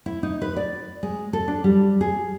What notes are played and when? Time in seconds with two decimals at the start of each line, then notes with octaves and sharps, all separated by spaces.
0.06 E4
0.23 D#4
0.42 B4
0.56 D5
1.03 G#3
1.33 A4
1.48 D4
1.64 G3
2.01 G#4